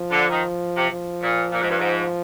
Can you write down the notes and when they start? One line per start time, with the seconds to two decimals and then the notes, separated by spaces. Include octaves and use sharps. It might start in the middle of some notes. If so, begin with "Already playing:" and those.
Already playing: F3
0.11 D3
0.30 D#3
0.76 C3
0.91 F3
1.22 A#2
1.52 A#2
1.61 G#2
1.69 G2
1.78 G#2